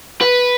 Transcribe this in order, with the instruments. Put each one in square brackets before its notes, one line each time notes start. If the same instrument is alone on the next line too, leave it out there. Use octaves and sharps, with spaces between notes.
[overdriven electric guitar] B4